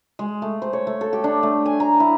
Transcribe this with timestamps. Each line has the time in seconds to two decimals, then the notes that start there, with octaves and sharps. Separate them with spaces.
0.19 G#3
0.42 A3
0.62 C5
0.73 C#5
0.87 A3
1.01 A4
1.13 G4
1.24 D4
1.43 A3
1.66 G#5
1.80 A#5
2.00 E4